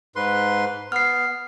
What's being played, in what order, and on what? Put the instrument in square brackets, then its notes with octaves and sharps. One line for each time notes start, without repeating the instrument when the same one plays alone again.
[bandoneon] G#2 B4 C6
[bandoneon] B3 [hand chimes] F6 C7